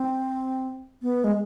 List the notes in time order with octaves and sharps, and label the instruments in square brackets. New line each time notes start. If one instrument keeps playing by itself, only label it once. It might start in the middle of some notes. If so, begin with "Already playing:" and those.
Already playing: [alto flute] C4
B3
G#3